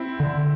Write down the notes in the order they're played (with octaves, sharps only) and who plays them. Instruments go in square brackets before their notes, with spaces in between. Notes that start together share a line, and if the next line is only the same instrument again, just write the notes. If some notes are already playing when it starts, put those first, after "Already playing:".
Already playing: [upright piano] C4 E4
[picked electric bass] D3